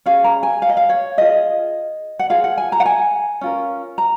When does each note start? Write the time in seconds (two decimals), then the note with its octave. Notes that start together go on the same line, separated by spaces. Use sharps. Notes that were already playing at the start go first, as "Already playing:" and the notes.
0.06 C#4 G#4 F5
0.24 A#5
0.43 G#5
0.62 F5
0.69 D#5
0.77 F5
0.89 C#5
1.18 F4 G#4 D#5
2.19 F#5
2.30 F4 G#4 F5
2.44 F#5
2.58 G#5
2.72 A#5
2.80 F#5
2.86 G#5
3.41 C#4 F4 A#4
3.98 A#5